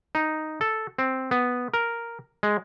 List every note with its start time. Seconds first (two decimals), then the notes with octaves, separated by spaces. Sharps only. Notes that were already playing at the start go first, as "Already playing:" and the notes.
0.15 D#4
0.61 A4
0.98 C4
1.31 B3
1.74 A#4
2.43 G#3